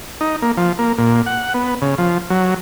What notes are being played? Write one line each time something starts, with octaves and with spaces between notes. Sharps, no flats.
D#4
A#3
F3
A#3
A#2
F#5
B3
C#3
F3
F#3